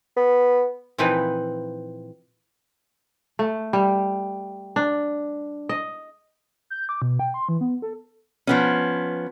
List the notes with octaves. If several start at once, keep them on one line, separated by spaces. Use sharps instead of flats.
B3
A#2 E3 F3 C4 D#4 B4
A3
G3
D4
D#5
G6
D6
B2
G5
C6
E3
B3
A4
F3 B3 C#4